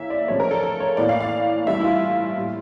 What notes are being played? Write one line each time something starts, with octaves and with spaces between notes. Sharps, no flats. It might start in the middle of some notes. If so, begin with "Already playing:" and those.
Already playing: C#3 E3 A#3 C#5 E5
D5
C#3 F3 A3 C#5
A#4
A4
A4
C#5
A2 E3 A#3 D5
F5
F5
G2 E3 A3 E5
E4
F4
A2 G3 A#3